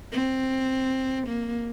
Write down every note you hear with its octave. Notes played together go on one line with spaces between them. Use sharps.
C4
A#3